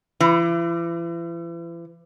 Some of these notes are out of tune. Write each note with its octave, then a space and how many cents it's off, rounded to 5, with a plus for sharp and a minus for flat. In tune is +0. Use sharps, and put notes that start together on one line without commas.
E3 +40